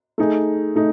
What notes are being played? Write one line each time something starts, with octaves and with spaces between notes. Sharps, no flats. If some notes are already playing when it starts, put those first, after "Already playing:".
A3 D#4 G#4
A3 D#4